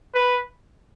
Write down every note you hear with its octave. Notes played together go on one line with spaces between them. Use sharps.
B4